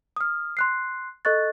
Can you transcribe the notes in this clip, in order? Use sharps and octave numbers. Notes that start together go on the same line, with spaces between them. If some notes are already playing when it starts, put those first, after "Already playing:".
D#6 F6
C6 F#6 C7
A4 D#5 C#6 F#6 A6